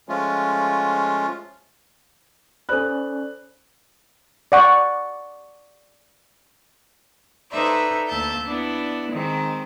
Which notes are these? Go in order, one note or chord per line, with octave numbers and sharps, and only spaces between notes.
F3 G#3 A3 C#4 F4
C#4 A4 C5 D5 B5 F#6
D5 F#5 C#6
D#4 A4 B4 C5 D5 E5
D2 A#3 E5 A5 G6
B3 D4 E4
D#3 G#3 C4 D#4